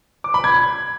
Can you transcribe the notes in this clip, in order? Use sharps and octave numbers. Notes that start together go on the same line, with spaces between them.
D6
B5
G#6